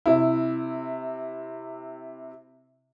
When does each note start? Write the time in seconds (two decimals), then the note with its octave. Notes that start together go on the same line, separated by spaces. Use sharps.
0.06 C3 E4